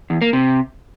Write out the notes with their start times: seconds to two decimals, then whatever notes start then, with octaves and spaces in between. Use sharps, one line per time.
0.10 E2
0.22 A#3
0.33 C3